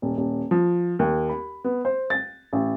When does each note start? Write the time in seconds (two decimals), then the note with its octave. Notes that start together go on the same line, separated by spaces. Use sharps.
0.02 D#1
0.17 D#1
0.51 F3
0.99 D#2
1.29 B5
1.64 B3
1.85 C5
2.10 A6
2.53 A1